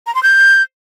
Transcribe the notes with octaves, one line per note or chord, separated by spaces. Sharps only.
A#5
C6
G6